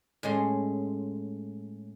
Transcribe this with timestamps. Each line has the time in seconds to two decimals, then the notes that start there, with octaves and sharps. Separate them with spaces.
0.23 A2 G#3 C#4 C6